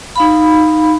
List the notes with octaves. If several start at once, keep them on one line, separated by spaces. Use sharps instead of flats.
D#4 F5 B5